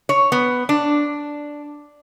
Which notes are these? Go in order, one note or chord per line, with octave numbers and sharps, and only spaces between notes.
C#5
B3
D4